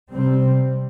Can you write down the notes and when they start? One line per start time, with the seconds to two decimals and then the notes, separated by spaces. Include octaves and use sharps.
0.12 C3 G3 C4